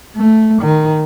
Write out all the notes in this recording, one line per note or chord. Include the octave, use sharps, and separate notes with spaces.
A3
D#3